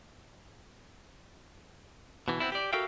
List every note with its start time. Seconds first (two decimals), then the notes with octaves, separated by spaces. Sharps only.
2.28 B2 E3
2.40 B3 C4 D4 E4
2.52 G4 D5
2.73 F#4 A4 A#4 E5 F5 G5